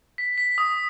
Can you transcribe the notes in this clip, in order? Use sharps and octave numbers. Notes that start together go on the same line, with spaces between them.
B6
B6
D#6